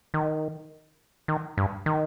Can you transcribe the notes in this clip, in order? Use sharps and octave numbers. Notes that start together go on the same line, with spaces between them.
D#3
D#3
G2
D#3